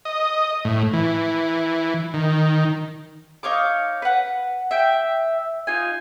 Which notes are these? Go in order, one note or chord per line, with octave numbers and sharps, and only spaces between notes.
D#5
A2
E3
D#3
D#4 C#5 F5 D6
B4 F#5
E5 G5
D#4 F4 G#5